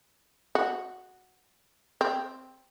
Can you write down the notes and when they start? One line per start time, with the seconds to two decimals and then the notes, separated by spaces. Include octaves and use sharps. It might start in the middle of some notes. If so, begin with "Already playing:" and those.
0.55 F#4
2.01 C4